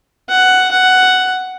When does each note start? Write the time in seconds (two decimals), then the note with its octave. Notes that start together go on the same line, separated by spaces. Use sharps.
0.30 F#5
0.71 F#5